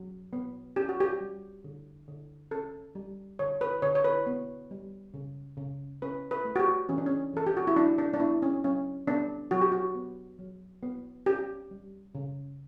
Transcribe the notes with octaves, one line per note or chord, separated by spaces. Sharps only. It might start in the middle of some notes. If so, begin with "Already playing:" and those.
Already playing: F#3
B3
C#4 G4
F#4
G4
G3
D3
D3
C#4 A4
G3
D3 C#5
B4
D3 C#5
C#5
B4
B3
G3
C#3
C#3
C#4 B4
B4
A3
F#4
G4
E3 C#4
D4
C#4
E3 A4
G4
F#4
E4
F#3 D4
D4
D4
B3 E4
C#4
F#3 C#4
B3 D4
F#3 F#4
G4
F#4
B3
F#3
B3
C#4 G4
G3
C#3